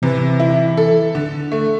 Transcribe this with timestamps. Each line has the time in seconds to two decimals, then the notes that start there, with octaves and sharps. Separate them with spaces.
0.02 C3 E3
0.40 E4
0.77 A4
1.15 D3
1.52 A3